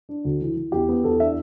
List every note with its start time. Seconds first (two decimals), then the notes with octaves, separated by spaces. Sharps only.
0.09 D4
0.25 D2
0.41 E3
0.57 E3
0.72 E2 G4
0.89 B3
1.04 E2 A4
1.20 D4 E5